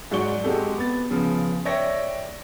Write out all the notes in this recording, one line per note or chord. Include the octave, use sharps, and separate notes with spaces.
G#2 F#3 F#4 D5 C#6 G7
G#3 C4 F#4 G4 A4
B3 A6
C#3 F3 B3
C#5 D5 E5 G5 A#6